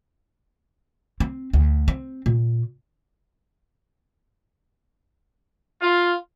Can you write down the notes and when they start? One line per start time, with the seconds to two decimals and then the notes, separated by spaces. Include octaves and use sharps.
1.20 C4
1.53 D2
1.88 C4
2.26 A#2
5.82 F4